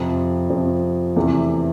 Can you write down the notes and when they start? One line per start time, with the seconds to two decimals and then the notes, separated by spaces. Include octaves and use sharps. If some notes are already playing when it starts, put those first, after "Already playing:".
Already playing: F2 C3 F3
0.49 F2 C3 F3
1.16 E2 C3 E3 A3